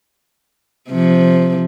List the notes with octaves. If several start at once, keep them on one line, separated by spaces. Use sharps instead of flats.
C3 F3